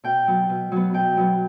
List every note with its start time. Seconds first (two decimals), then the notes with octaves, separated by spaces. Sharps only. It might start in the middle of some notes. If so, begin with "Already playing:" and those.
0.04 B2 G5
0.27 F#3 B3
0.49 B2
0.72 F#3 B3
0.94 B2 G5
1.17 F#3 B3